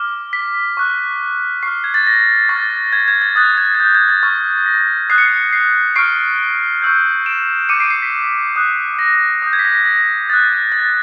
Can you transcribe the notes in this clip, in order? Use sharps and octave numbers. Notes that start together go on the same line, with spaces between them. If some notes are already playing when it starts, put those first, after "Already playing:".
Already playing: D6 F6
B6
C#6 F#6
C#6 F6 C7
G#6
A6
A#6
C#6 F6 A6
G#6
G#6
A6
D#6 F#6 A6
G#6
G#6
G6
G#6
A6
C#6 F6 A6
A#6
D#6 F#6 C7
C#7
C7
C7
C#6 F6 C7 D7
C#6 E6 G6
D7 E7
D6 G6 C#7 D#7
C7 D7
C7
B6
D#6 F#6
A#6
D#6 G6
G#6
B6
A#6
B6
A#6
D#6 F#6 A6
A6